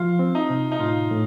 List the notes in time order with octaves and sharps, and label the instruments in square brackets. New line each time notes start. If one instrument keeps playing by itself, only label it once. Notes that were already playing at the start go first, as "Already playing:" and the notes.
Already playing: [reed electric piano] F3 [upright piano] F4
[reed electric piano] C4
[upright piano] D#4
[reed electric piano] C3
[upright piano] D#4
[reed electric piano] A2 [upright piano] F4
[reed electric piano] A2